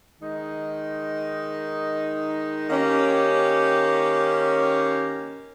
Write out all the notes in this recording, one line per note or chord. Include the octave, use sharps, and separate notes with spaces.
D#3 G#3 D#4
D#3 A#3 C#4 G4